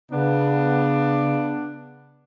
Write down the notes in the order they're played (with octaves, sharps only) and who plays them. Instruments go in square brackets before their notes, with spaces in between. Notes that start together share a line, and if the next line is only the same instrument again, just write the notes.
[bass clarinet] C#3 [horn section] B3 D4